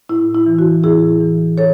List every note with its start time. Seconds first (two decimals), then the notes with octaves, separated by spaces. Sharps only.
0.09 A2 E4
0.34 E4
0.46 E3
0.59 F#4
0.83 A2 E4 G#4
1.20 E3
1.58 A4 C#5